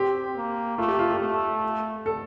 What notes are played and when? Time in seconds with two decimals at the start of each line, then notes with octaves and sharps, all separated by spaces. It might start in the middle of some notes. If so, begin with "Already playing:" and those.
Already playing: C4 G4
0.36 A#3
0.78 A3 F4
0.88 G4
0.99 F4
1.10 G4
1.20 A3
2.06 A4